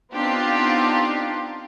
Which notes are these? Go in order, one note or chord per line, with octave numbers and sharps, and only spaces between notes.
B3 C4 D4 D#4 F4 G4